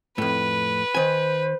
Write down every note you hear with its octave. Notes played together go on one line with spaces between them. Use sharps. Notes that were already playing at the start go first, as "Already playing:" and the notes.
F2 A2 B4
D#3 C5 G#5